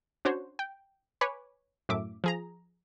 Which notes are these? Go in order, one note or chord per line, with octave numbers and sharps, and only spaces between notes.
C#4 D4 F#4 C5 C#5
G5
B4 C#5 G#5 B5 D6
F#2 A2 E5 D6
F3 G#4 A#5